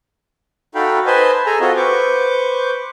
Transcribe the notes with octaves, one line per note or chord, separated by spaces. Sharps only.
D#4 F#4 A4 F5 G5 B5
B4 C5 D#5 G#5 A5 B5
G#4 A4 G#5 A#5
C4 F4 F#4 A4 D#5
B4 C5 C#6 D6